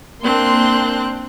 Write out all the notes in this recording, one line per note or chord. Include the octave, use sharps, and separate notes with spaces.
A#3 C4 D4 C6 F#6